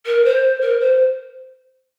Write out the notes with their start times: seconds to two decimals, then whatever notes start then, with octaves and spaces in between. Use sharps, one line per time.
0.06 A#4
0.24 C5
0.61 A#4
0.80 C5